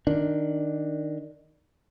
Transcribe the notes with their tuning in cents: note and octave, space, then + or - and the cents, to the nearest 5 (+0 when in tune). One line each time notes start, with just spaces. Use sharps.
D#3 -5 D4 +0